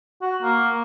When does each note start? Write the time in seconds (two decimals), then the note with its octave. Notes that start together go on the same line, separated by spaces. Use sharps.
0.22 F#4
0.42 A#3